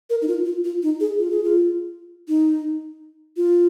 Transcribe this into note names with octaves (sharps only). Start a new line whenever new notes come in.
A#4
D#4
F4
F4
F4
D#4
G#4
F4
G#4
F4
D#4
F4